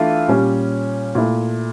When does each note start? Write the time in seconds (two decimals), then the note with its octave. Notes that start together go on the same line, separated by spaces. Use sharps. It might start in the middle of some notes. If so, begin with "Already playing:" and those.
Already playing: E3 A3 D4 F4
0.28 A#2 G3 C#4
1.15 A#2 A3 E4